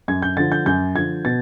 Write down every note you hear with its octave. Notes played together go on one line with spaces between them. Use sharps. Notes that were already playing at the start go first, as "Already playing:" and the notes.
F#2 G#6
G6
D3 F3 A6
G6
F#2 G6
D3 F3 G#6
B2 A6